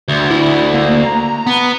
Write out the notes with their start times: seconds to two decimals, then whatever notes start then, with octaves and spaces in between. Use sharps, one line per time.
0.08 D2
0.30 E4
0.74 A#3
1.03 A#5
1.47 B3